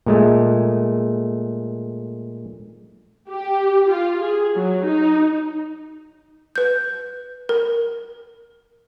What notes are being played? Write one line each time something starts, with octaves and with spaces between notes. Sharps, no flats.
A#2 G#3 A3
G4
F4
G#4
F#3
D#4
B4 G6
A#4